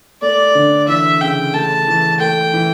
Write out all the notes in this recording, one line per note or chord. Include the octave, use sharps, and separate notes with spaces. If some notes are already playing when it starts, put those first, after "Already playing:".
A3 D5
D3
E3 E5
C#3 G5
A3 A5
E3
A3 G5
E3